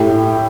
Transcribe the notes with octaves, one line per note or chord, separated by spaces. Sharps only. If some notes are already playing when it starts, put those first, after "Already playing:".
Already playing: A2 E4 G4